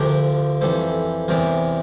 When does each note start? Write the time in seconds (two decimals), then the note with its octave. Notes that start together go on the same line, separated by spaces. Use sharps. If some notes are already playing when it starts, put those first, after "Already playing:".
Already playing: D2 D3 F3 G4 A#4
0.61 F2 E3 G3 A4 C5
1.28 E2 C3 E3 G3 G4 A#4